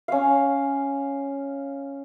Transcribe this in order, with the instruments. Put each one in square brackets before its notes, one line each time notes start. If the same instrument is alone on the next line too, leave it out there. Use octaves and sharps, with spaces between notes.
[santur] C#4 F5